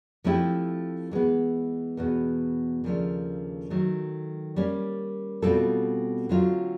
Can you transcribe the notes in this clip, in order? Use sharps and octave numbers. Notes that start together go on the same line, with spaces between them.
F3 A3 C4 E4 G4
E3 G#3 B3
E2 B2 G#3 B3
D#2 C#3 F3 A3 D4
D#3 F#3 A3
G3 A#3 C#4
B2 G3 C4 F4 A4
D3 F#3 A3 C4 F4